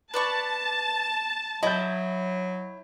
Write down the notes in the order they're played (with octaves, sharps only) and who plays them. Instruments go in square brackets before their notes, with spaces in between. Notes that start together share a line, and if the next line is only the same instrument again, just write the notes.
[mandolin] B4 D5 C#6 [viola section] A5
[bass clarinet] F#3 [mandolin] E4 [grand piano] D#5 G6